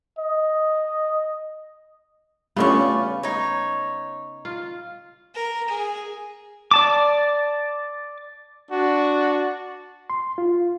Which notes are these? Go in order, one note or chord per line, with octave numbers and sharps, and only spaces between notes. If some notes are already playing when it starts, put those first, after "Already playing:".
D#5
C#3 G3 A3 B3 C#4 F4 D5 C#6
D#4 C#5
F4
A#4
G#4
D5 A5 D6
D4 F#4
C6
F4